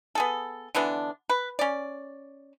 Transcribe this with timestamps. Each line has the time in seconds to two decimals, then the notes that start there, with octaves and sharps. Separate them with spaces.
0.15 B3 G#4 A4
0.75 D3 E3 B3 D4
1.30 B4
1.59 C#4 D5